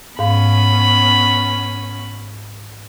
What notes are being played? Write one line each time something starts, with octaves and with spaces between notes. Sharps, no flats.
G#2 B3 C#4 F5 B5